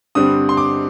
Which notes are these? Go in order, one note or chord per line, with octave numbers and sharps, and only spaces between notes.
G2 D3 G3 C4 D#6
C6
D6